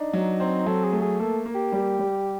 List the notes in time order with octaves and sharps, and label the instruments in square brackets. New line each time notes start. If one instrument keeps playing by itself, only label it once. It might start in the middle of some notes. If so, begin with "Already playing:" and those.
Already playing: [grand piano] D4 [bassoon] D#4
[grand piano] F#3
C4
[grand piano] F#3 [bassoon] A4
[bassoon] G#4
[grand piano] A3
[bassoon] G#4
[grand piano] A#3 [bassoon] A4
[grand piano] A#3
[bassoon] G4
[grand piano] G3
G3